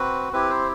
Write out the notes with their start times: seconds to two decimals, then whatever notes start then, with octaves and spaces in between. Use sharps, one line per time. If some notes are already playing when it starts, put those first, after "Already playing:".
Already playing: C4 F#4 B4
0.33 C4 E4 G4 B4
0.50 C5